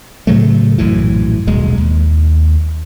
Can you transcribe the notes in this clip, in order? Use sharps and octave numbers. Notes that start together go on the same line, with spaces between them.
A2 C#3 F#3 A3
A#1 F#2 A2 E3
D#1 B1 G#3
D#2